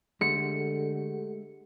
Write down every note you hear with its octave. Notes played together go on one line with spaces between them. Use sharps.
D3 G#3 A3 G4 A4 F#5 C#7